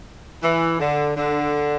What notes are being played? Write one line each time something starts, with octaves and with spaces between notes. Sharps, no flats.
E3
D3
D3